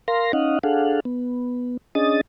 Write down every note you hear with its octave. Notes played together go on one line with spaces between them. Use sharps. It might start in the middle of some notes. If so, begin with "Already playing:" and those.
A#4 F5 C6 A#6
C#4 D#4 D#5 F5 F#5
D4 G#4 A4 F5 F#5
B3
C#4 D4 G#4 D#5 D#6 A6